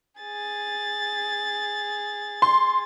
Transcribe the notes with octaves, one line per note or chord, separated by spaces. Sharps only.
G#4 A6
C6